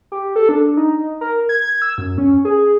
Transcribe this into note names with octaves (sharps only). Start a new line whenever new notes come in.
G4
A4
D4
D#4
A#4
G#6
G#6
E6
F#2
C#4
G#4